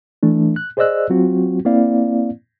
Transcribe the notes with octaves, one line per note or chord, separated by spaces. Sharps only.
E3 A3 D4
F#6
G#4 C5 D5 D#5 E6 F#6
F#3 C4 F4 F#4
A#3 C4 E4 D5 F5